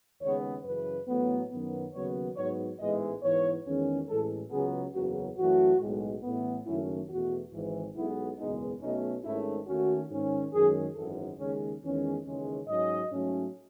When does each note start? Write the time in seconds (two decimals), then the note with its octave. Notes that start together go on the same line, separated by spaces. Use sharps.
0.21 D#2 C#3 G#3 B3 C#5
0.65 F#2 C#3 E3 B4
1.07 A1 A2 F#3 B3
1.51 F#2 D#3 F#3 B3
1.93 D#2 C#3 F#3 B3 C#5
2.36 G#2 F#3 B3 C#5
2.80 A1 G#2 E3 G#3 B3 D#5
3.22 G#2 E3 B3 C#5
3.66 E2 D#3 G#3 C#4
4.08 A1 A2 E3 G#3 A4
4.51 C#2 C#3 F#3 B3 G#4
4.94 F#1 E2 C#3 F#3 F#4
5.37 F#2 E3 A3 C#4 F#4
5.80 B1 A2 G#3
6.23 A1 A2 E3 B3
6.66 F#1 F#2 D#3 A3 C#4 E4
7.09 E2 B2 A3 F#4
7.52 G#1 G#2 E3
7.95 B1 B2 G#3 B3 E4
8.38 F#1 E2 B2 G#3 B3 D#4
8.81 B1 B2 A3 C#4 D#4
9.24 G#1 G#2 D#3 A3 C#4 E4
9.67 D#2 D#3 A3 C#4 F#4
10.10 G#2 D#3 G#3 C#4
10.53 F#2 D#3 G#3 C#4 G#4
10.96 G#1 F#2 E3 A4
11.39 D#2 C#3 G#3 C#4
11.82 E2 D#3 G#3 C#4
12.25 D#2 C#3 E3 G#3 C#4
12.68 G#2 F#3 C#4 D#5
13.11 G#2 F#3 A3 C#4